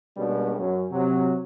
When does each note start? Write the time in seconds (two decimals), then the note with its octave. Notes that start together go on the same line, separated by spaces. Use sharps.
0.17 B2 G3 G#3 A#3 C#4 D4
0.58 F#2 C#4
0.91 C3 F#3